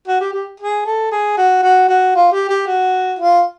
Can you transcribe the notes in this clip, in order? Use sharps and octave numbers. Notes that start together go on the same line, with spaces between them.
F#4
G4
G4
G#4
A4
G#4
F#4
F#4
F#4
F4
G4
G4
F#4
F4